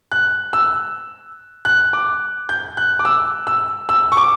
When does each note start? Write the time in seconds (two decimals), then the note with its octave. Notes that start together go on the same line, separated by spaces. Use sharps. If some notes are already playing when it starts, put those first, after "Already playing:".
0.12 F#6
0.53 E6
1.65 F#6
1.93 D6
2.49 G6
2.77 F#6
2.99 D6
3.05 E6
3.47 E6
3.89 E6
4.12 C#6
4.17 D6